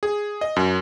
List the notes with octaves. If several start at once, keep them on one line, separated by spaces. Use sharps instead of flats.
G#4
D#5
F#2